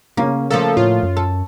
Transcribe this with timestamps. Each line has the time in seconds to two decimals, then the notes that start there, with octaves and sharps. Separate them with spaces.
0.17 C#3 A#3 C#4
0.51 F3 A3 A#3 A4
0.77 A2 F4 C#5
1.03 F#2
1.17 A4